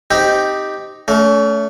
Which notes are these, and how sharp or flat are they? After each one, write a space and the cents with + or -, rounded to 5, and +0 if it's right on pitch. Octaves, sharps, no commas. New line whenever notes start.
C4 +0 D#4 +0 G4 +0
A3 +0 C#4 +35